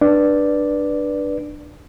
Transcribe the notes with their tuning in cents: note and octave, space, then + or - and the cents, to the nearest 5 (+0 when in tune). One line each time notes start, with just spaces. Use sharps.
D4 +15 B4 -15 D5 +0